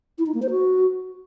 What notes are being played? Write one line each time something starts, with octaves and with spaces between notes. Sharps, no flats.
E4
D#4
A#3
C5
F#4